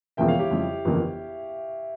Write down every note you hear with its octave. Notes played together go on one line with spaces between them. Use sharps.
E1 E2 C#3 F3 A#3 E5 G5
C#5 F5
E4 G4
F2 C#3 G3
G1 F2 C#3 E3 A#3